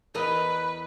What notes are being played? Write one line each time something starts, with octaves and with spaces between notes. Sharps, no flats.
E2 A#4 B4 D#5